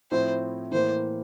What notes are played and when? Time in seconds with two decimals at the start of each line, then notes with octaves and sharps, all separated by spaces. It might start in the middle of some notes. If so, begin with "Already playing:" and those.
0.11 A2 F3 C4 E4 C5
0.72 A2 E3 A#3 C5